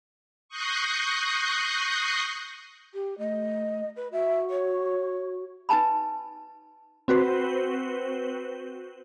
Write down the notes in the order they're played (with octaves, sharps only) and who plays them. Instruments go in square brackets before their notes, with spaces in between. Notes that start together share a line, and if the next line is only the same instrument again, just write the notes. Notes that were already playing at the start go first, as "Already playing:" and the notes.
[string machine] C#6 D#6 F#6 G6 A#6 C7
[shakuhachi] G4
[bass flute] A3 [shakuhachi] D#5
[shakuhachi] B4
[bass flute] F#4 [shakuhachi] E5
[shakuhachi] C#5
[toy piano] D#4 B4 G#5 A5 B5
[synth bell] C4 F#4 B4 C5